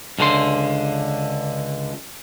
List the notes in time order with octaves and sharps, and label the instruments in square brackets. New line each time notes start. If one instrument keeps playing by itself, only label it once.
[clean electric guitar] C#2 D3 C6